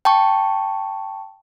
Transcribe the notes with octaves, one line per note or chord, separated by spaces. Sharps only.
G5 A5 C#6